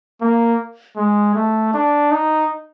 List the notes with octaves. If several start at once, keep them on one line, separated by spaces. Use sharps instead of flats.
A#3
G#3
A3
D4
D#4